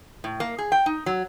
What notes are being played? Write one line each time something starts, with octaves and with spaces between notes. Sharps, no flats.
A2
A#3
G#4
G5
D#4
F#3